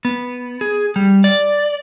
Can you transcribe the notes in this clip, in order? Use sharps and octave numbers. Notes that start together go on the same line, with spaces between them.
B3
G#4
G3
D5